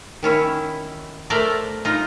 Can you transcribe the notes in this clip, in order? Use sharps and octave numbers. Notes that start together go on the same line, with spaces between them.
D#3 C#4 E4
A3 A#4 C5 D5 E5 A#5
D#4 F4 D#5